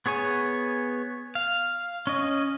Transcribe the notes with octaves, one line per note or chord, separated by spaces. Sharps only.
B3 G#4 C#5 G#5
F5
C#4 D#5